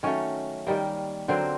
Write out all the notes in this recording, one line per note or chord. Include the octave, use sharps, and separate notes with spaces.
D#3 F#3 A3 C#4 C#5
D#3 G3 A#3
D3 F#3 A#3 C4 C5